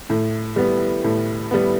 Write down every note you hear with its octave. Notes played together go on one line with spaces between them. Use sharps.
A2
G3 B3
A2
G3 B3